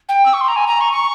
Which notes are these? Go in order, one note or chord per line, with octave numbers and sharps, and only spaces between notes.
G5
E6
C#6
C6
A#5
G#5
A#5
C#6
C#6